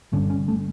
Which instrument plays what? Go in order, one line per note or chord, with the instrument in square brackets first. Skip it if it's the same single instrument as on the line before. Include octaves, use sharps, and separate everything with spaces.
[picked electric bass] G1 G2 D3 C#4
C#4
A3